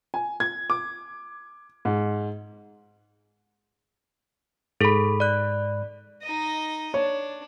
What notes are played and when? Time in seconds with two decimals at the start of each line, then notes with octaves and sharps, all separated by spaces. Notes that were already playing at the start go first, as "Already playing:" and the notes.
0.14 G#5
0.40 G#6
0.70 D6
1.85 G#2
4.81 G#2 G#4 A4 B5
5.20 D5 F#6
6.22 D#4 D#5
6.94 D4 C#5